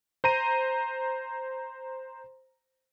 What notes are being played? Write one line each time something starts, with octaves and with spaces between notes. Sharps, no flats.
C5 A#5 D#7